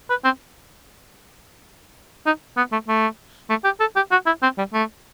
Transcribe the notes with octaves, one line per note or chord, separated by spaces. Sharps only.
B4
C4
D#4
B3
A3
A3
A3
G4
A4
G4
F#4
E4
C4
G3
A3